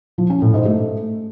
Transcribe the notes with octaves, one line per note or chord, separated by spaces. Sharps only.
F3
C#4
A2
G#2
A3